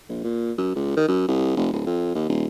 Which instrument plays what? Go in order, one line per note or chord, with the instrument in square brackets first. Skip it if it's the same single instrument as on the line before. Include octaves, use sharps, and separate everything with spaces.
[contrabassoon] A#1
A#2
F#2
C#2
D#3
F#2
C2
F1
D1
F2
D#2
D#1